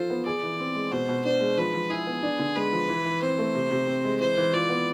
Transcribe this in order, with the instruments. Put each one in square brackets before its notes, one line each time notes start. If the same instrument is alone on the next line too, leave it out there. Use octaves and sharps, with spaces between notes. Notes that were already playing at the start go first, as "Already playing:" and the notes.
Already playing: [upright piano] F3 F4 A4 [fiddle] C5
[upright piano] B3
[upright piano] G#4 [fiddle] D5
[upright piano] E3
C4
G#3
[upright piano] B2 [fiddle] C5
[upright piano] B2
[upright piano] D4 [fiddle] C5
[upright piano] G#3
[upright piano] F3 [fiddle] B4
[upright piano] F3
[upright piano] E4 [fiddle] G#4
[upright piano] B3
D4
D3
[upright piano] G#3 [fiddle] B4
[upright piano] F3
E3
E3
[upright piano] C4 [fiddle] C5
[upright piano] A3
C3
C3
C4
G#3
[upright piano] E3 [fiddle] C5
[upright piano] E3
[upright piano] F4 [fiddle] D5
[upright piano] B3